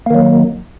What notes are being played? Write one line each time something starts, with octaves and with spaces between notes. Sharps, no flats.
D#3 F#3 A#3